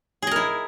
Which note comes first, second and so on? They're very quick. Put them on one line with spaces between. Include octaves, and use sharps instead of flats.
G#4 D#5 A#4 E4